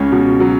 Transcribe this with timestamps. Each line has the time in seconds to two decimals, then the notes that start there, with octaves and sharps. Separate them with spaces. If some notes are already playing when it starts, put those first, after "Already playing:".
Already playing: C#2 C#4
0.12 B2
0.40 F#3